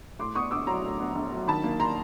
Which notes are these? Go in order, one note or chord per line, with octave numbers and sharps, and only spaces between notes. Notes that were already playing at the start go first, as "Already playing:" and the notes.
A2 C6 D6
B3 C#6 D#6
A#1 D6 E6
F#3 A#5 C6
A2
B3
A#1
F#3
D#3 A5 B5
A#3
A#5 C6